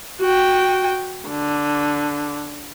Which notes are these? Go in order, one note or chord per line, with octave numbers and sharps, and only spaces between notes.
F#4 G5
D3